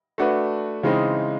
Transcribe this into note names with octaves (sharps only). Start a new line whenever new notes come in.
A3 D4 F#4 B4
C#3 E3 G#3 C4 D#4